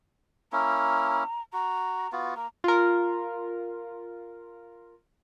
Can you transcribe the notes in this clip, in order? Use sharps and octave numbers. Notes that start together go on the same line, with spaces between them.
A#3 C#4 E4 A#5
F#4 A#5
B3 F4 F#4
A#3 A#5
F4 A#4